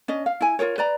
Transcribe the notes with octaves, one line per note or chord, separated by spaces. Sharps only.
C#4 D4 D#5
F5
E4 G#5
F4 G#4 A#4 C#5
B4 D5 A#5